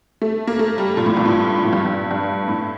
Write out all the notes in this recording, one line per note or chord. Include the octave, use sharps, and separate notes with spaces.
A3
A#3
A3
G3
A#2
A2
G2
A2
A2
G2
G2
G2
A2